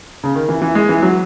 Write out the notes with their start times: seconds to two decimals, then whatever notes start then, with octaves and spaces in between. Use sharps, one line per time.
0.24 C#3
0.35 D#3
0.49 E3
0.62 E3
0.75 G#3
0.89 E3
1.02 F#3